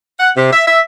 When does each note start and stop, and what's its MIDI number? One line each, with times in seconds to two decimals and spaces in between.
0.20 0.30 78
0.37 0.52 48
0.53 0.66 76
0.68 0.80 76